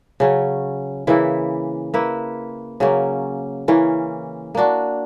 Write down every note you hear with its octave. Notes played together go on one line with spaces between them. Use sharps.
C#3 F#3 C#4
C#3 E3 A#3 E4
A#3 E4 B4
C#3 F#3 A#3 C#4
E3 A#3 C#4
A#3 D4 F#4